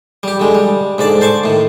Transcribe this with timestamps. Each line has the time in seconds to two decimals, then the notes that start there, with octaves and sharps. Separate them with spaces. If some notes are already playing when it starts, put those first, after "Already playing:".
0.23 G3 G4
0.39 D3 G#3
0.55 G3
0.98 G#2 D3 D5 A5
1.21 C5 A5 C#6 D6
1.44 A2 D#3